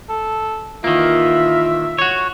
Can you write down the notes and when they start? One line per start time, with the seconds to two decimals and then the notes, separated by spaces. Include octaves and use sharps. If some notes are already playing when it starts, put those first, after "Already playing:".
0.09 A4
0.84 A#2 D#3 E3 A#3 F4 E5
1.98 F#4 C#5